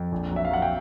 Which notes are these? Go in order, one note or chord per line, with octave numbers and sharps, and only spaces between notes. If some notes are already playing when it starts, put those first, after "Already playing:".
Already playing: F2
A#1
F#3 E5
F5
F#3 F#5
G5